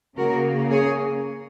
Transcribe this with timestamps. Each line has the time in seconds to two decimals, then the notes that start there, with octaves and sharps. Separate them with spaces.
0.17 C#3 A#3 F#4 A#4
0.71 G#4 C#5